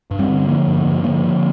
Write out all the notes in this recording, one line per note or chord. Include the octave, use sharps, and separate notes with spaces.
G2
G3 C4
D3
D3 F3 A#3
G2
G2
D3 F3 A#3
D3